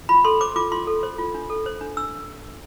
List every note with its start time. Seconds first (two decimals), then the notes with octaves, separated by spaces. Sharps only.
0.09 F4 B5
0.25 A4 C6
0.41 C5 D6
0.56 F4 D6
0.72 F4 C6
0.87 A4
1.03 C5
1.19 F4
1.35 D4
1.50 A4
1.66 C5
1.81 D4
1.97 D4 E6